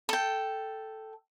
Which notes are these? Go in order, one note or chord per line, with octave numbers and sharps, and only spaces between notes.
A4 G5